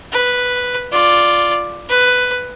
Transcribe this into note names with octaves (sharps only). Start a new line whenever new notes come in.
B4
F4 D5
B4